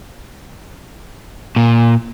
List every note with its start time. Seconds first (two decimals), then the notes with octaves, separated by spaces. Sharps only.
1.56 A#2